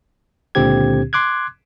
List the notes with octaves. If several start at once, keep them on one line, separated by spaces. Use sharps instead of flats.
C#2 A#2 D3 C4 G4 G#6
C6 D6 F#6 G#6